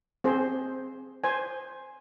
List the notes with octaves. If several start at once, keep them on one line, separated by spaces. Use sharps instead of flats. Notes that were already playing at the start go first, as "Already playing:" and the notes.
C4 G#4 C5
C5 G#5